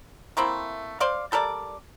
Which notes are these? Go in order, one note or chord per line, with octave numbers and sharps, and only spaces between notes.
A3 A#3 C4 E4
C5 D5 F5
G3 A4 A#4 D5